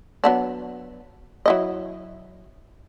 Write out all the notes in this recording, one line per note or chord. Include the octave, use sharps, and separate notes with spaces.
F#3 B3 D4
F#3 E4 D#5